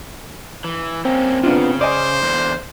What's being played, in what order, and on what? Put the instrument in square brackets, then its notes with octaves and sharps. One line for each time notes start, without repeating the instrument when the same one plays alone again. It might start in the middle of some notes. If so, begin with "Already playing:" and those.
[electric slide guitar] E3
[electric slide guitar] C3 A#3 C#4 [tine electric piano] C4
[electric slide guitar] C#3 [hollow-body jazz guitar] B3 D4 F4
[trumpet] C5 [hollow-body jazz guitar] D5 D#5 G#5 [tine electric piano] D6
[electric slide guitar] E2 D3